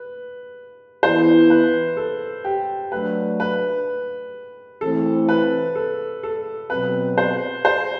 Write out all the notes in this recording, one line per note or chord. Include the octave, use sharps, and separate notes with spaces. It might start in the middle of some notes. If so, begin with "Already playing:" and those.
Already playing: B4
E3 B3 E4 C5
B4
A4
G4
F#3 A3 D4 B4
B4
E3 A3 C4 A4
B4
A4
A4
B2 F#3 C4 B4
C5
C5